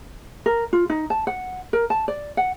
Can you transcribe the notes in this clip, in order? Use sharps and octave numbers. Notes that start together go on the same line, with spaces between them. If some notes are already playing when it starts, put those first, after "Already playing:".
A#4
F4
D#4
A5
F#5
A#4
A5
D5
F#5